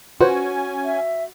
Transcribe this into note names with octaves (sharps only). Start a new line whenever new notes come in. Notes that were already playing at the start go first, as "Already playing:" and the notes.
C#4 F4 F#4 B4 C5 G#5
E5